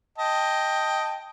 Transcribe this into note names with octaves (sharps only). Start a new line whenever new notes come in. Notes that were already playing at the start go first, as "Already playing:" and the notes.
D#5 G5 A5